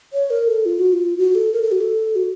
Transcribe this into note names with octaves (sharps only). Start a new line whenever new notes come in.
C#5
A#4
A4
F4
F#4
F4
F#4
A4
A#4
A4
F#4
A4
F#4